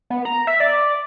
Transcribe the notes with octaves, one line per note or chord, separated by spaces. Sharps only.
B3
A#5
E5
D5